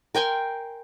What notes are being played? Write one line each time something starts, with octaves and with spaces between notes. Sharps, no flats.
A#4 G5 G#5 C6